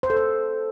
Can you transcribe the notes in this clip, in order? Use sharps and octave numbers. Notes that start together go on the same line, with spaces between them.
C5
A4
C5